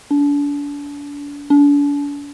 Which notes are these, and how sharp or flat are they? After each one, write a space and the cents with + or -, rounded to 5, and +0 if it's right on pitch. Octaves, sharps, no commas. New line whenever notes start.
D4 -35
D4 -40